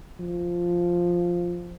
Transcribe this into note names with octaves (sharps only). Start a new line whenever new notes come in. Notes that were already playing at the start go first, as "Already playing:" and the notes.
F3